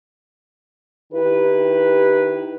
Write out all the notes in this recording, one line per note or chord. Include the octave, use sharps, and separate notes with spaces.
D#3 E4 G4 B4